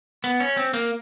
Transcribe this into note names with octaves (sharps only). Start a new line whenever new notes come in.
B3
C#4
C4
A#3